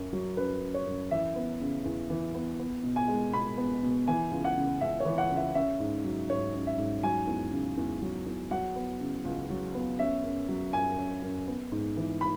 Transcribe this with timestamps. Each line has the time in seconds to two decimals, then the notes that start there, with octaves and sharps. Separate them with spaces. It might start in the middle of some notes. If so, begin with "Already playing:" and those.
Already playing: F#2 C#4
0.13 F#3
0.37 F#2 B4
0.62 C#4
0.74 C#5
0.86 F#2
1.11 E3 E5
1.36 B3
1.61 C#3
1.85 E2
2.10 E3
2.34 B3
2.59 B3
2.84 B2
2.96 G#5
3.08 G#3
3.33 B2 B5
3.57 B3
3.83 B2
4.08 E3 G#5
4.31 C#2
4.44 F#5
4.57 C#3
4.81 C#2 E5
5.00 C#5
5.05 E3
5.18 F#5
5.31 C#2
5.37 E5
5.55 C#4 E5
5.80 G#2
6.05 F#3
6.29 G#2 C#5
6.54 C#4
6.67 E5
6.78 G#2
7.03 F#3 G#5
7.27 E2
7.52 C#3
7.78 E2
8.02 F#3
8.26 E2
8.51 F#3 F#5
8.76 B3
9.01 C#3
9.25 C#2
9.50 F#3
9.75 B3
9.99 C#4 E5
10.24 F#2
10.49 F#3
10.73 F#2 G#5
10.98 C#4
11.22 F#2
11.47 B3
11.72 G#2
11.97 E3
12.21 B5